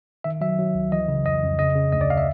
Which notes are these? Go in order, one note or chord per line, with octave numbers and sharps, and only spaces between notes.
D#3 E5
F#3 E5
F#3
C#2
E3 D#5
C#3
F2 D#5
F2
C#3 D#5
C#3
D2 D#5
D5
F5
E5